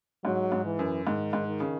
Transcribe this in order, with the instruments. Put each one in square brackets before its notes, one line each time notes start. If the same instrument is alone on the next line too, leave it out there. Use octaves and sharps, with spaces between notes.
[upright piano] G#2 [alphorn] F#3
[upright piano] G#2
[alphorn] E3
[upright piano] F#2
[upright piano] G#2 [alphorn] D#3
[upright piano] G#2
[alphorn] D#3
[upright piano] C#3